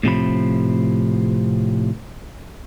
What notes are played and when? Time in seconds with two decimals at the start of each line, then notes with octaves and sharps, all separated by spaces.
0.03 A2 C3 F3 B5